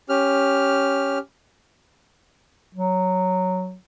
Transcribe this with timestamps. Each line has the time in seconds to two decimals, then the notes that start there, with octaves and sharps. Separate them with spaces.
0.09 C#4 G4 F6
2.75 F#3